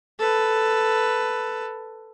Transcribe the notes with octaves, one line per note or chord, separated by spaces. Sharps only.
A4 B4